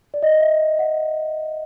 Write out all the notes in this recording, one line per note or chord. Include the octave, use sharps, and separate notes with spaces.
D5
D#5
E5
F#5